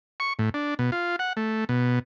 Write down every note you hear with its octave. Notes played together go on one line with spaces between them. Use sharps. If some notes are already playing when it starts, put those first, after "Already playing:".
C#6
A2
D4
B2
F4
F#5
A3
B2